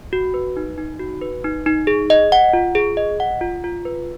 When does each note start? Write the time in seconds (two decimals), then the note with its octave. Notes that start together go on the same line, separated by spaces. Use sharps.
0.13 F#4
0.34 B4
0.57 D#4
0.78 D#4
0.99 F#4
1.22 B4
1.44 D#4
1.66 D#4
1.87 G#4
2.10 D#5
2.32 F#5
2.53 F4
2.75 G#4
2.97 D#5
3.20 F#5
3.41 F4
3.64 F4
3.85 B4